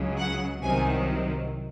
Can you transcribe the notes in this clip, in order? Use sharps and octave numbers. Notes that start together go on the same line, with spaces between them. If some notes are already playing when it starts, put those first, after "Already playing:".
Already playing: C#2 C#3 F#3
F#5
C2 C3 D#3 F#3 G#5